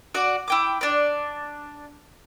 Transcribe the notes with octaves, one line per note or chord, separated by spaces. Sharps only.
F#4 D5 F#5
E4 G5 D6
D4 D5